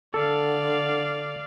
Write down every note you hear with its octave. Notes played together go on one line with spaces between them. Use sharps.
D3 A4 D5 F5